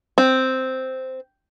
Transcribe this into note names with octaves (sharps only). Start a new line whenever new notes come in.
C4